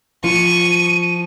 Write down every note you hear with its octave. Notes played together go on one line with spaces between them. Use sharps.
F3 F4 C#6 D#7